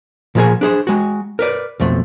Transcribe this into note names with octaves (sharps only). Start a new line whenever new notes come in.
A#2 F3 F4 G#4 A#4 G#5
D4 G#4 C5
G#3 F#4
A#4 B4 D5
B1 F2 F3 A3